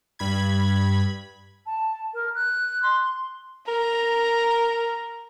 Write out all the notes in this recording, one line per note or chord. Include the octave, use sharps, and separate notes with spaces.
G2 B5 G#6
A5
A#4
F#6
C6
A#4 A#5